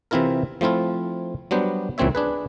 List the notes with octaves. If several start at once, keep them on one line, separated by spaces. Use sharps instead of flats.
C3 E3 C4 E4 F4 A#4
F3 A3 C4 E4 F4
F#3 G3 B3 D4 C5
C#2 A#2 E3 C4 C#5 E5
D4 G#4 B4